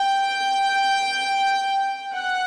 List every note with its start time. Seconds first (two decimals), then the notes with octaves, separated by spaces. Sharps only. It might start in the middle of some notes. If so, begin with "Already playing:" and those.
Already playing: G5
2.14 F#5